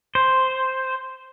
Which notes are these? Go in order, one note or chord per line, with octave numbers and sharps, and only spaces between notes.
C5